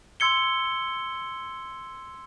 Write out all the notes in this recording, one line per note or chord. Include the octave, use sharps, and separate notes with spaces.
C6 E6 G#6 C#7 G7